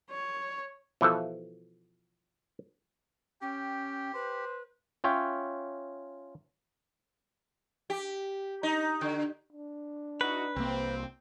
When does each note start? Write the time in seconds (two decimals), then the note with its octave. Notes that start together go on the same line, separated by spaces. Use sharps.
0.10 C#5
1.01 B2 E3 F3 A4
3.42 C#4 G4 G5
4.14 B4 C5
5.04 C#4 F4 C#5 E5 G5
7.90 G4
8.63 D#4
9.01 D3
9.52 D4
10.21 D#4 E4 F#4 B4
10.56 C2 A#3 C4